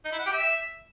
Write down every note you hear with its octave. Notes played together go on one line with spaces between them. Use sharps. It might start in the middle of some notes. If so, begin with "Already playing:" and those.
D#4
E4
F#5
G4
E5